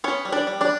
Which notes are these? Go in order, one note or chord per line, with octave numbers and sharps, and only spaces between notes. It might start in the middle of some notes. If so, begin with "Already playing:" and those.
B3 C#4 C#5
G3
D4 D5
G3
D4 D5